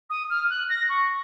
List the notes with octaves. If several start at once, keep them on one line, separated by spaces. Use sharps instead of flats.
D#6
F6
F#6
A#6
C#6